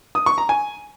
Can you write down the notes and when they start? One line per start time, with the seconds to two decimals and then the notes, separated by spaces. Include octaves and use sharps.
0.15 D#6
0.26 C#6
0.38 A#5
0.49 G#5